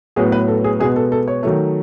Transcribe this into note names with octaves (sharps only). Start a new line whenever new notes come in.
A2 F#3 B3 G#4
B4
A4
G#4
B2 G#3 B3 G#4
A4
A4
C#5
D#3 F#3 A3